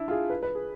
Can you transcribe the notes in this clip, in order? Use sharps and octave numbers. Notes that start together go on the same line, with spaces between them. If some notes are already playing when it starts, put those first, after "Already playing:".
Already playing: D4 E4
F4
G#4
B4
B4
G#4